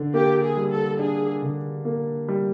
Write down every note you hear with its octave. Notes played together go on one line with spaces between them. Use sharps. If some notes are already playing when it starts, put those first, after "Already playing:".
Already playing: D3 D4
A#3 G4
G#4
G3
A4
D4 G#4
D3
A#3
G3